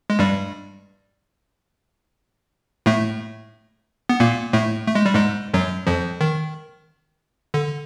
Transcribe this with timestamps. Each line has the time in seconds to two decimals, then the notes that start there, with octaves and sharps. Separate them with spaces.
0.10 G#3
0.19 G2 G3
2.86 A2 A3
4.09 B3
4.20 A#2 A#3
4.53 A2 A3
4.87 A3
4.95 G#3
5.06 G3
5.14 G#2 G#3
5.54 F#2 F#3
5.87 F2 F3
6.21 D#3
7.54 D3